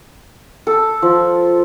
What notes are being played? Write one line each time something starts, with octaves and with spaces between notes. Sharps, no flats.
A4
F3